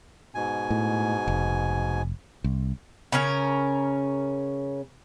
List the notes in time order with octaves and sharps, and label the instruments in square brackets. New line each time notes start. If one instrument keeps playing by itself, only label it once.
[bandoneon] G#2 B2 G#5
[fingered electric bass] A2
F1
C2
[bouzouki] C#3 C#4 A#4